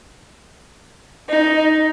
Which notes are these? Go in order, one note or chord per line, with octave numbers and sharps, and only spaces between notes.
D#4